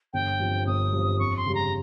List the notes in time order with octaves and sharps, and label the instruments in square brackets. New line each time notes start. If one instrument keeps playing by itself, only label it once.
[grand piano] G1 [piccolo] G5
[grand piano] G2 F3 C4
[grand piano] G1 [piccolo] D#6
[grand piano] G2 F3 C4
[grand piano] F2 [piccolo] C#6
[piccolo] C6
[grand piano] C#3 G3
[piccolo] A#5